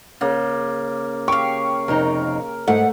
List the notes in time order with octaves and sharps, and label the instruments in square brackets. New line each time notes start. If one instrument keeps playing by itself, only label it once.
[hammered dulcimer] C#3 A#3
[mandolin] G4 F5 [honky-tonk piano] C#6
[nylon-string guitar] F2 C3 D#4 [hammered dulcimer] A#4
[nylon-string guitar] G#2 [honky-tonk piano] A3 [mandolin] F#5